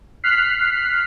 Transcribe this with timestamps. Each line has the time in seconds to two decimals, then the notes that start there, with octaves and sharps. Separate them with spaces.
0.24 F6 F#6 B6 C7